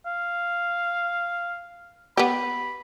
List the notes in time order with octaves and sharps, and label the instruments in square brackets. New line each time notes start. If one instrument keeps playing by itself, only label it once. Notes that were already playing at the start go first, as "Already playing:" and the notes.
[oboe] F5
[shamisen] B3 G4 [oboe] B5